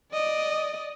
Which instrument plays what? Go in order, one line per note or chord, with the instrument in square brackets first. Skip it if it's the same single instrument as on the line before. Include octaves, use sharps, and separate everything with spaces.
[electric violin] D5 D#5